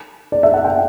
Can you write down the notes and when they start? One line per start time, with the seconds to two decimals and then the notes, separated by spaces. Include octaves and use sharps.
0.32 D5
0.43 E5
0.54 F#5
0.65 G5